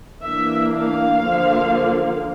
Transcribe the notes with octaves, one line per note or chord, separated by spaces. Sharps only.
E3 A#3 D4 E5
F5
D3 F3 A#3